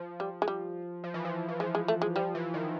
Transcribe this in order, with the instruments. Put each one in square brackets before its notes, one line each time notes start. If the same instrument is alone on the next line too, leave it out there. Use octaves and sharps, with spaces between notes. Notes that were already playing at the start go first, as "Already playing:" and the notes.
Already playing: [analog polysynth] F3
[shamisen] G3
G#3
G3
[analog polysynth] F3
E3
F3
E3
[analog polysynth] F3 [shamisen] G#3
[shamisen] G#3
A3
G#3
[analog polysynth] F3 [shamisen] G3
[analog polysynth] E3
D#3